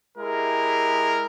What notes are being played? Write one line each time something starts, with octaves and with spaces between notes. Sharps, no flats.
G#3 E4 G4 A#4